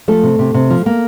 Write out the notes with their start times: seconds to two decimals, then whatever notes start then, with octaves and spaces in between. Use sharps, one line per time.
0.08 F3 A3 A4
0.23 C3
0.39 C3
0.54 C3
0.70 F3
0.86 A#3